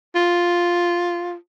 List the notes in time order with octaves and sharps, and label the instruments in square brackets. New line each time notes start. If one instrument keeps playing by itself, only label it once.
[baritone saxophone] F4